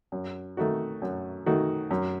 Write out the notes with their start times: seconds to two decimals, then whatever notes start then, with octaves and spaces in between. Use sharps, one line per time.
0.12 F#2
0.57 D#3 A3 D#4 F#4
1.02 F#2
1.46 D#3 A3 D#4 F#4
1.91 F#2